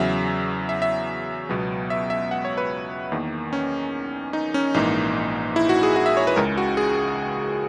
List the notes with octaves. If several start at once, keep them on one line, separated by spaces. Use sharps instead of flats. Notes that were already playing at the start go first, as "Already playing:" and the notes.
Already playing: E2 C#3 F#3 E5
E5
E5
C#2 B2 F#3 B3
E5
E5
F#5
C#5
B4
E2 D#3 A#3
C#4
D#4
C#4
A#1 G#2 E3 A#3 D#4
E4
F#4
G#4
F#4
E5
C#5
B4
C#2 C#3 G#3 A#4
F#4
G#4